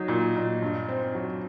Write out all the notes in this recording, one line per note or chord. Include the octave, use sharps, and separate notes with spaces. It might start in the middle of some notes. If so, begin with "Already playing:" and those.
Already playing: F#3 D#4
A#2
A#2
G2
C4
F#3